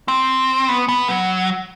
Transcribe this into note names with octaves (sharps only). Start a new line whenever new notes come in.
C4
B3
B3
F#3